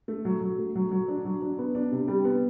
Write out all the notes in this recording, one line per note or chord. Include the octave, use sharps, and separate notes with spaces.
A3
F#3
F#3
A3
F#3
F#3
D4
F#3
D4
B3
D4
C3
G3
B3